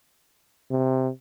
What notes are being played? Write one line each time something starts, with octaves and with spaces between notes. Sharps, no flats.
C3